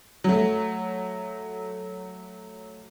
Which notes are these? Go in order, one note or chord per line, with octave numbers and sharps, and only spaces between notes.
F#3 A3